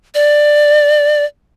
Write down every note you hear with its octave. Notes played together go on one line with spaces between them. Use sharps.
D5